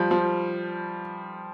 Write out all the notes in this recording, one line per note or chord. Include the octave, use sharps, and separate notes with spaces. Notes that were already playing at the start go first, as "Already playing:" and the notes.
Already playing: F3 G3
F3